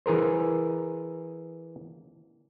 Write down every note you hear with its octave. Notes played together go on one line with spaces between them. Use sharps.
E3 G#4 A#4 C5